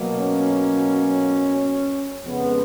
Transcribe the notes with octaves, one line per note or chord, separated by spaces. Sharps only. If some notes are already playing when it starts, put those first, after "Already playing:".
Already playing: B2 F#3 A#3
C#4
F2 C#3 G#3 B3